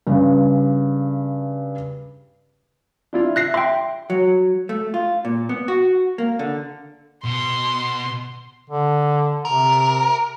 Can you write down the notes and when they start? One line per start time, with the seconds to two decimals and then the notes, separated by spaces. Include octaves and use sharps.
0.07 G2 C#3
3.13 D4 E4 F4
3.36 E5 F#6 A#6 C7
3.54 E5 G5 C6
4.10 F#3
4.69 A3
4.94 F4
5.25 A#2
5.49 B3
5.68 F#4
6.18 A#3
6.39 D3
7.25 B2 C6
8.70 D3
9.45 C3 A#4